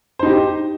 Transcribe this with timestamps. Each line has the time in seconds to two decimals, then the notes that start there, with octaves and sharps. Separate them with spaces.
0.19 C5
0.23 D#4
0.26 G4